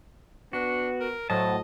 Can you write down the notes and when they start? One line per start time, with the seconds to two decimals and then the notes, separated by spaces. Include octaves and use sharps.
0.53 B3 D4 F#4
1.00 A#4
1.30 A2 F#3 C5 D#5 A5